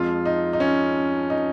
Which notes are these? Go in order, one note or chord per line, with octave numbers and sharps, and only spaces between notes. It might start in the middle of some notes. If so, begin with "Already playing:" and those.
Already playing: F2 F3 G#3 F4
D#4
D#4
C#4
D#4